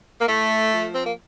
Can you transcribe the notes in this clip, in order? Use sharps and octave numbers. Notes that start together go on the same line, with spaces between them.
A#3
A2 A3
F3
C4
A#3